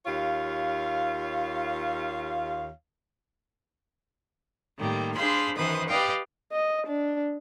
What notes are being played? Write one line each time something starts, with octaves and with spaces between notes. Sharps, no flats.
D#2 F4 C#5 F5
A2 D#3 G3 A#3
D4 G#4 C5 F5 B5 C6
F#2 D#3 E3 B4 C5 D#6
G4 B4 D5 D#5 F5 G5
D#5
D4